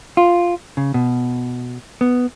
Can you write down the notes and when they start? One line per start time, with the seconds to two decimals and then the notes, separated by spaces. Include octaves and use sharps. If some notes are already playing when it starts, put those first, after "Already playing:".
0.17 F4
0.77 C#3
0.94 B2
2.01 B3